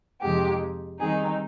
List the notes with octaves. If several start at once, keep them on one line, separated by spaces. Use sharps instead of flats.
F2 C3 F3 G#3 D#4 G4
D#3 G3 C4 D#4 G#4